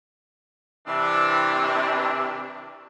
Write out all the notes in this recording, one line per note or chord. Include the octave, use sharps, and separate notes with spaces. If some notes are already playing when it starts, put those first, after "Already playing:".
C3 E3 D4